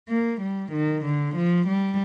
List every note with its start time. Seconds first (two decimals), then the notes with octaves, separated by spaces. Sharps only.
0.10 A#3
0.41 G3
0.72 D#3
1.05 D3
1.35 F3
1.67 G3